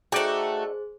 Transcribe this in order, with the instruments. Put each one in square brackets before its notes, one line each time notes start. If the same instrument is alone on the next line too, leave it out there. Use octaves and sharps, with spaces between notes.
[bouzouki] A3 F#4 [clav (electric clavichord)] D#4 D5 G5 [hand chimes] G#4 C5